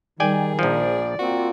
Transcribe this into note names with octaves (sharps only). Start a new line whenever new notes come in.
D#3 G3 G#4 D5 G5 G#5
A#1 F3 D5
A#3 C4 F4 F#4